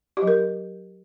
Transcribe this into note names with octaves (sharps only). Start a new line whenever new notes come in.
G4
F#3
A#4